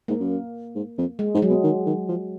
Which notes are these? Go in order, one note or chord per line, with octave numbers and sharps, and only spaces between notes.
G#2 A#3
F#2
G#2
F2
G#3
G#2
G#3
F#3
B2
D#3
D#3
F3